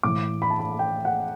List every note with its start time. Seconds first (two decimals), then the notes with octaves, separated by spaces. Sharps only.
0.03 A2 E3 D6
0.42 B5
0.50 A5
0.59 B5
0.79 G5
1.05 F#5